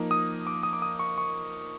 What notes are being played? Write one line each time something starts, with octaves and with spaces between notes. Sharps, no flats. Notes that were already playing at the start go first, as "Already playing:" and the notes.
Already playing: F3 A#3 D#4
D#6
D6
D#6
D6
D#6
C#6
C#6